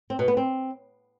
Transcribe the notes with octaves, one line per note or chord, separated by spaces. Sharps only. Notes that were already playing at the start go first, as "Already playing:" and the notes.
C4
B2
B3
C4